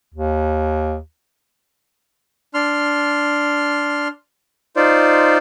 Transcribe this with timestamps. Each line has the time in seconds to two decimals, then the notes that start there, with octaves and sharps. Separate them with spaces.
0.14 D#2
2.54 D4 C6 F6
4.76 D#4 F4 C5 D5